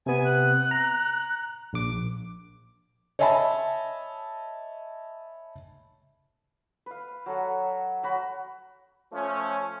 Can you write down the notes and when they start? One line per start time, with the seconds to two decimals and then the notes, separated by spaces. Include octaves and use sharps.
0.06 C3 B3 G#5
0.25 F#6
0.71 A#5
1.73 A#1 D6
3.19 C#5 D#5 E5 G#5 A5 B5
6.86 B4 F5
7.26 F#3 A4 F#5
8.03 F#3 F#4 B5
9.13 F3 A3 C#4